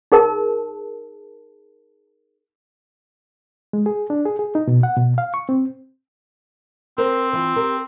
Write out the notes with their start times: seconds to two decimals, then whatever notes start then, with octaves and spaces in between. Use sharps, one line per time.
0.12 D#4 G#4 A#4 A5
3.73 G#3
3.86 G#4
4.10 D4
4.25 G#4
4.39 G#4
4.55 D#4
4.68 B2
4.83 F#5
4.97 B2
5.18 F5
5.34 C#6
5.49 C4
6.98 C4 A#4 C5
7.33 E3 F4
7.56 G4 A#4